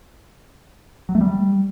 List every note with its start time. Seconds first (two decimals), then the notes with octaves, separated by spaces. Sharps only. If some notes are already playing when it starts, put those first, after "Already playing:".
1.09 F#3
1.15 A3
1.21 G3